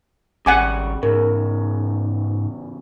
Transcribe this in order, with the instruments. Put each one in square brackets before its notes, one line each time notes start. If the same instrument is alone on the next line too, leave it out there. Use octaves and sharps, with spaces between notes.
[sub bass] G#1 [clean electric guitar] C#3 G3 [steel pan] F#5 G#5 D6
[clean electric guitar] E2 C#3 [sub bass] G#2 [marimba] A#4